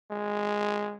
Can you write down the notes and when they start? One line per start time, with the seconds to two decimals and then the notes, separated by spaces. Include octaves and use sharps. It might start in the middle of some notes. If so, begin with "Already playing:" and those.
0.11 G#3